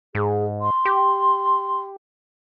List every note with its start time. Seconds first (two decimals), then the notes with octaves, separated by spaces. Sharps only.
0.15 G#2 G#4
0.61 C6
0.85 G4